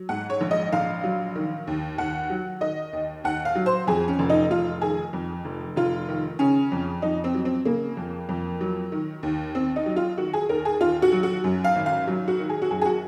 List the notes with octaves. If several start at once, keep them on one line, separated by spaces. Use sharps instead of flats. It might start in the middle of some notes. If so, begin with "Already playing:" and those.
Already playing: F#3
G#2 F#5
C#5
A#1
D#5
A#1 F5
F#3
D#3
D#2
D#2 F#5
F#3
D#3 D#5
D#2
D#2 F#5
F5
F#3
C5
F2 G#4
C#4
F1
D#4
F1 F4
D#3 G#4
F2
F1
F1 F4
D#3
C#3 C#4
F2
F2 D#4
C4
F#3
C4
C#3 A#3
F2
F2
F#3
D#3
D#2
D#2 C4
D#4
F#3
F4
D#3 F#4
G#4
D#2 A#4
G#4
D#2 F4
F#4
F#3
F#4
F#2
F5
G#1
F5
F#3
F#4
D#3
G#4
F#4
F#2 G#4
G#4
F#4